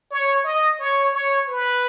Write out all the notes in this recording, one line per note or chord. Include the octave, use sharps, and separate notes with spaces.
C#5
D#5
C#5
C#5
B4